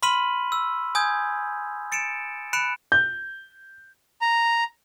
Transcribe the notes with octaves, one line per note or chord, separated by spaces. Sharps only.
B5 C6 F6 B6 D#7 F#7
E6
G#5 D#6 G6 G#6
A6 C#7 D7 E7
B5 F#6 C#7 D7 E7
G6
A#5